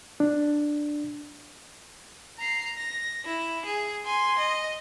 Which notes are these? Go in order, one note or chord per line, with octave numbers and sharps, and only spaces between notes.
D4
A#5 C7
A#6
E4
G#4
G#5 C6
D#5